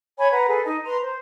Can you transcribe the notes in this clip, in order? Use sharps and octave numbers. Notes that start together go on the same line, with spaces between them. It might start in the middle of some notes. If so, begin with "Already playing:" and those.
C#5 G#5 B5 C#6
B4 F#5 A#5
G#4 A4 B4
D#4 D#5
B4 A#5 C6
C5